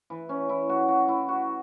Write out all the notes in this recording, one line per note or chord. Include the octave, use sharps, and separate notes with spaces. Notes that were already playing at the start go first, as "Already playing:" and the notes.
E3
C#4
E4
F#4
F#4
E4
F#4